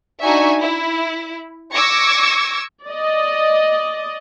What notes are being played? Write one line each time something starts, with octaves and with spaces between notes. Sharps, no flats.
D4 D#4 F#4 E5 G#5 C#6
E4
C#6 D6 E6 G#6 A#6 C#7
D5 D#5